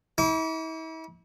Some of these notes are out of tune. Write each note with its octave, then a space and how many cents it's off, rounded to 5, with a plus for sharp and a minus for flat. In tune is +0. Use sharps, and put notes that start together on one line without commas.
E4 -40 D6 -40